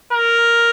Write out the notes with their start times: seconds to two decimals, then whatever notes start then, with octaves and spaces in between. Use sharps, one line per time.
0.13 A#4